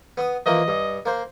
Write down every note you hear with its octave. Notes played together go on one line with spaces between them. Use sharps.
B3 D#6
E3 F3 A#3 D#5
G2
A#3 C5